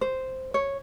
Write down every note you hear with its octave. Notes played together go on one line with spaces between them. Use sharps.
C5
C#5